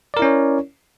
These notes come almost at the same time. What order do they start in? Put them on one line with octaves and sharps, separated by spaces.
D5 A#4 E4 C#4 C#5